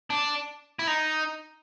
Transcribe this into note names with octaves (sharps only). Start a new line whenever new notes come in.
D4
E4
D#4